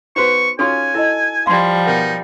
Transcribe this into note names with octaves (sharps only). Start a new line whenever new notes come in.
B3 D#4 F#4 B4 C5 C#6
C#4 D#4 F4 F#4 A4 C#5 G#5
E4 A4 D#5
F3 G3 F5 C6
B2 D#4 A#4 F#5